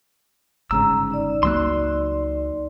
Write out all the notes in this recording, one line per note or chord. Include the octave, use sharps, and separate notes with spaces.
G1 G#2 C#3 A#5 E6
D#4 D5
C#2 F#3 A#3 C6 E6 F#6